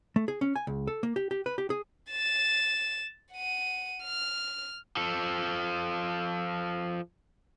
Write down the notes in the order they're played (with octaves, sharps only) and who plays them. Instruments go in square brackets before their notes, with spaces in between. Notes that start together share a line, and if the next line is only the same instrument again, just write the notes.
[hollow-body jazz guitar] A3
G#4
C#4
G#5
C#2
A4
A#3
G4
G4
B4
G4
G#4
[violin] A6 E7
F#5 D#7
F6
[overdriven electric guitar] F3 A4